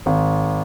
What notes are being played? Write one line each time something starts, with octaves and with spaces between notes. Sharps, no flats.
G#1